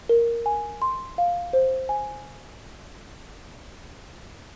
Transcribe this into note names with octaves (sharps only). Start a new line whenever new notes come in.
A#4
G#5
C6
F5
C5
G#5